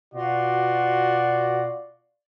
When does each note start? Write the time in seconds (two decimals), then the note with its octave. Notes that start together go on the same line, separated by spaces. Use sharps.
0.14 B2 F4 F#4 D5